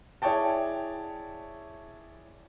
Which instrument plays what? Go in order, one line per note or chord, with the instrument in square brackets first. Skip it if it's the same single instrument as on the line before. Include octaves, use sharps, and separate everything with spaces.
[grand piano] E4 G#4 C#5 D5 G5 A5